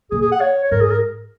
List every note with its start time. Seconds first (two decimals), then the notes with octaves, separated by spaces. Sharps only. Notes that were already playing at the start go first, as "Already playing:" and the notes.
0.11 A#2 G#4
0.21 G#4
0.32 F#5
0.41 C#5
0.64 C#5
0.71 G#2 A#4
0.81 G#4
0.91 A#4